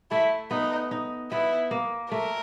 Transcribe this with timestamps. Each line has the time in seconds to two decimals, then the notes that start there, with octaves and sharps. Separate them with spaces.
0.11 A3 E4
0.51 B3 D#4
0.91 D#4
1.32 B3 E4
1.71 A#3
2.11 A3 A#4